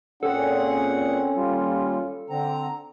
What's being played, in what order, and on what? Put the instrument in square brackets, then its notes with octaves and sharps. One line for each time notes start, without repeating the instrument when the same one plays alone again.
[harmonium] A#2 G#4 F#5 [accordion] C4 [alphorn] C#4 [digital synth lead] A4
[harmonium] D#2 [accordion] G3 F4
[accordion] D3 C4 [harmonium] A#5